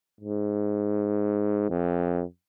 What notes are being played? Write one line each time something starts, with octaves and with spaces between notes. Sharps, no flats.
G#2
F2